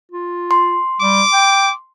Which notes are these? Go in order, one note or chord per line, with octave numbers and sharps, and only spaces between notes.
F4
C6
G3 D6
G5